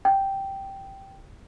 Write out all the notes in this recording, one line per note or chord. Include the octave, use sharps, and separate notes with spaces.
G5